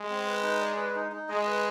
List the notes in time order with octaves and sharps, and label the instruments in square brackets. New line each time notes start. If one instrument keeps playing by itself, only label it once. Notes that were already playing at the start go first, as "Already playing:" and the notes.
Already playing: [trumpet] G#3
[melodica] C4
B4
D#4
D5
B4
D#4
D#4
[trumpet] G#3 [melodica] D#5
[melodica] B4